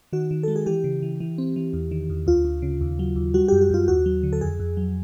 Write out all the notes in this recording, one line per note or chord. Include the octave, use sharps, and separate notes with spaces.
D#3 F#4
D#3
G#3 A4
G#4
E3 G4
C#3
E3
E3
C4
E3
E2
D#3
E2
D2 F4
D2
C#3
D#2
F#3
D#2
G3 F#4
F#2 G4
F#4
F#2 F4
D#2 F#4
F#3
D3
A4
F2 G#4
F2
F#3